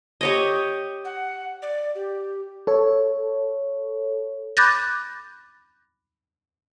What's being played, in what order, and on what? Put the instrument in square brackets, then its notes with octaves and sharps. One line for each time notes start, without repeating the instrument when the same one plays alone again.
[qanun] G4 C#5 D#5
[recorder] F#5
D5
G4
[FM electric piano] A4 C#5
[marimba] B5 D6 F#6 G6 A6 A#6